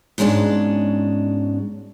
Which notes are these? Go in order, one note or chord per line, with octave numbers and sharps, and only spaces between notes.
G#2 B2 G#3 C#4 D4